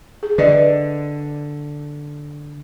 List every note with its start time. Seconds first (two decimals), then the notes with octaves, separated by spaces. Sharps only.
0.23 G#4
0.38 D3 B4 D5 D#5